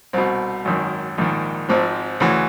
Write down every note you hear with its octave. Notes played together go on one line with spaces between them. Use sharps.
C2 B2 C4
G#1 F#2 D#3
A#1 G#2 D#3
G#1 G#2 F3 C4
D2 C#3 E3